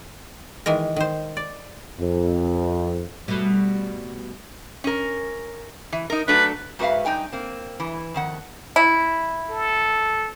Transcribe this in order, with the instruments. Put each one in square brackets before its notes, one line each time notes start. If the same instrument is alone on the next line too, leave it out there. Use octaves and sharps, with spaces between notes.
[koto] D#3 E3 G#3 A#4
D#3 C5
D5
[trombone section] F2
[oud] B2 G3 A3
[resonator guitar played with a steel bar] C#4 A#4
E3
D#4 A#4
[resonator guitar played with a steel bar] F#3 A3 D4 [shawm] B4
[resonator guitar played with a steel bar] G#2 F#4 B4 E5 F5
G2 D#4 G5 G#5
A#3 C4
E3
F2 D#3 F#5
[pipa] E4
[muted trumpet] A4